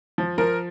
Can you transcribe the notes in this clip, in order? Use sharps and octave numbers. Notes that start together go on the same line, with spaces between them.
F3
F3 A#4